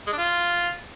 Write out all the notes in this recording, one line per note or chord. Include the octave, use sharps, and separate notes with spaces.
G#3
D4
F4